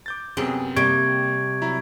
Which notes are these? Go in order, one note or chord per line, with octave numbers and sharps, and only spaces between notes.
D6 G6 A6
F#2 C3 B3 C4 G#4
C3 G3 A#3 C#6 G#6 D7
F#3 E4 A#5